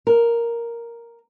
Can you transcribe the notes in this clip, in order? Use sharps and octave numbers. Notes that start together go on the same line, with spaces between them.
A#4